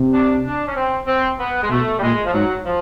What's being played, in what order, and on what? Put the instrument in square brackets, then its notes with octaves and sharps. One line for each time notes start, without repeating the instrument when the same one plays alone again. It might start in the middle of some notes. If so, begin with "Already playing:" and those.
Already playing: [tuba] C3
[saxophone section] D4
D4
C#4
C4
C4
B3
G#3
[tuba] B2 [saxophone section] A3
[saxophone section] G3
[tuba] A#2 [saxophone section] G#3
[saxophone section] F3
[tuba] G#2 [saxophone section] F#3
[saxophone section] F3